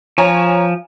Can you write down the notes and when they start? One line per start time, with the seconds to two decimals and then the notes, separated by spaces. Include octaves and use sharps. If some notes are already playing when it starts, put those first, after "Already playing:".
0.18 F3 C#5 G#5 A#5